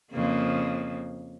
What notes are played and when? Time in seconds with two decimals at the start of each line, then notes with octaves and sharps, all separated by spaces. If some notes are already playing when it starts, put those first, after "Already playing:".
0.12 F2 C#3 A#3